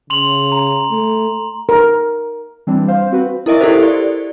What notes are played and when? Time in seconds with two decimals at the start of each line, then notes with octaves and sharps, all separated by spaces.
0.10 C#3 C6 F7 F#7
0.52 A#5
0.91 A3
1.69 A#4
2.67 E3 G3 C4 D4
2.88 C5 F5
3.11 C4 F#4 B4
3.46 E4 A#4 D#5 E5
3.61 E4 G4 A4 A#4 C5
3.83 D5